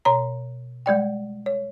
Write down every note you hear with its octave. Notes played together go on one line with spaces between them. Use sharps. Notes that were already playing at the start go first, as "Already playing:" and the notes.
B2 C#5 A#5
G3 G#3 D5 G5
C#5